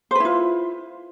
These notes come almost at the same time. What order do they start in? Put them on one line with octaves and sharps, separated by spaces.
C5 B4 E4 F4